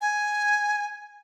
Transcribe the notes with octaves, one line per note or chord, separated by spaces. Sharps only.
G#5